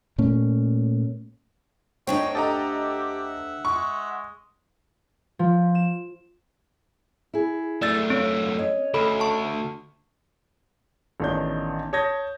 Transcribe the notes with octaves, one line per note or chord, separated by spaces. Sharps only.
A#2 A3 C#4
D2 C4 D4 D#4 C#5 G5
G4 A4 D#5 E5 F#5 A#5
G#3 C#6
F3
E7
E4 G#4
F#2 A3 D5 E6 A6
C4 F4 C#5
C#4 C#5 D#5
D2 A4 B5
A5 C#6
A1 B2 D#3 D4 C#5 G6
C#5 A5 D#6 G6 G#6 A#6